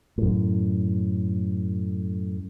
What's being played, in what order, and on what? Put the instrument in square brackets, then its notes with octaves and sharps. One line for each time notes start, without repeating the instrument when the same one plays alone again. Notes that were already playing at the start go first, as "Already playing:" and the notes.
[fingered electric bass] F#2 A2